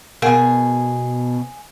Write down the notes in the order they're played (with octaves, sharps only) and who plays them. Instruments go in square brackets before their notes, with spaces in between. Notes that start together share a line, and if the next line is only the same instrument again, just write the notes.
[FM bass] B2 [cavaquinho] G#4 [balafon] A#4 F5 F#5